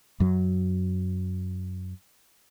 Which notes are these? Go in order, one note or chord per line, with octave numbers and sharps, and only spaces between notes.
F#2 F#3